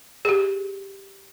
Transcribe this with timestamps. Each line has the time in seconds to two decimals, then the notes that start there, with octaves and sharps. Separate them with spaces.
0.25 G4 G#4